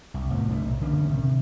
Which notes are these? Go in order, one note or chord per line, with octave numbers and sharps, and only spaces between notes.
C2
F1 F2 A2 B3
G2 A#2 G#3 A3
B1
D3 E3 A#3 C#4
C3 D#3